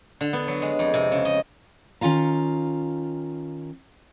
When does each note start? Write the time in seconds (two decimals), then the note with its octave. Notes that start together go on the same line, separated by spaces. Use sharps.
0.21 D3
0.33 B3
0.48 F#3
0.62 G#3
0.79 F2
0.94 C3
1.12 C#3
1.25 D#5
2.01 D#3 C#4 F4 F5 A#5